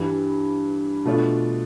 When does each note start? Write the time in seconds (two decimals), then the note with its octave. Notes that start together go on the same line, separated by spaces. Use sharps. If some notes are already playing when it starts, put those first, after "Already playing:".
Already playing: G2 E3 G3
1.05 B2 A3 D4 F4